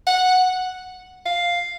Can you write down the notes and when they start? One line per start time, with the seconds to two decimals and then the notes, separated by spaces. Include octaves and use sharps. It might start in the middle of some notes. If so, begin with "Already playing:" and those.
0.07 F#5
1.25 F5